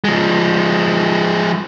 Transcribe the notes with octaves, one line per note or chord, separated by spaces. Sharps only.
F3 G#3